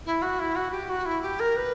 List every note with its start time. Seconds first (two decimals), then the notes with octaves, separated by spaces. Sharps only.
0.06 E4
0.22 F#4
0.39 E4
0.55 F#4
0.71 G4
0.89 F#4
1.05 E4
1.22 G4
1.39 A#4
1.56 B4